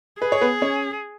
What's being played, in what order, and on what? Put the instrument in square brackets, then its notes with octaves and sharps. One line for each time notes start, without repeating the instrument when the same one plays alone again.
[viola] G#4 [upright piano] B4
[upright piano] C#5
B3 B4
C#4 C#5